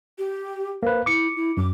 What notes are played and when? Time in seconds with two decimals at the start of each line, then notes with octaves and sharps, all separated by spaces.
0.18 G4
0.83 A#3 B4 C5
1.06 E4 D6 C#7
1.36 E4
1.57 F#2 D6